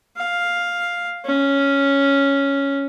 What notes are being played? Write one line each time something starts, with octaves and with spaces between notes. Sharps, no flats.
F5
C#4